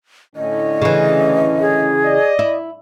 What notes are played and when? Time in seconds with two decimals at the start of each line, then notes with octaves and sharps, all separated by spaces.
0.36 A2 D3 C#4 D#5
0.82 C#3 E3
1.60 G#4
2.04 D5 D#5
2.39 E4